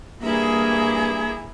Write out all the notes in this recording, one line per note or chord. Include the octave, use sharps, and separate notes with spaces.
G2 A#3 E4 G#4 A#5